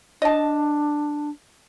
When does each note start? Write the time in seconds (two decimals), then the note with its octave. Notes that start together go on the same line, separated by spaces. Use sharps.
0.22 D4 D#5 A5